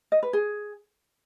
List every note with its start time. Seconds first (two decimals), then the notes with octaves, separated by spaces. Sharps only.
0.12 D#5
0.23 B4
0.33 G#4